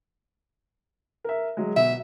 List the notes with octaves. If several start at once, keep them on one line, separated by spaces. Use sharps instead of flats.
A#4 E5
F#3 G#3
B2 E5